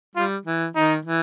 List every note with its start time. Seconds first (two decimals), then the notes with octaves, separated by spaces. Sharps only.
0.15 G3 F4
0.46 E3
0.75 D#3 D#4
1.05 E3